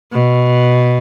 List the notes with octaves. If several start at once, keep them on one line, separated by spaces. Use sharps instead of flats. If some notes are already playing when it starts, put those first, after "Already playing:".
B2